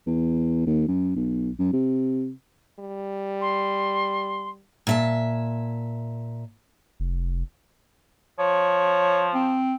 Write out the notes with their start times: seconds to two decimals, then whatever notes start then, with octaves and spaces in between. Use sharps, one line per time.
0.07 E2
0.67 D#2
0.88 F#2
1.16 B1
1.59 F#2
1.73 C3
2.79 G3
3.41 C6
4.87 A#2 E5 A5
7.00 F1
8.39 F3 C#5
9.34 C4